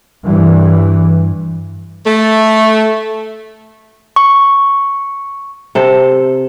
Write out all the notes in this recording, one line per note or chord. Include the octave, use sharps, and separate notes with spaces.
G2 E3
A3
C#6
C3 A4 C5